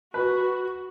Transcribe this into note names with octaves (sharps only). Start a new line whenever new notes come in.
F#4 B4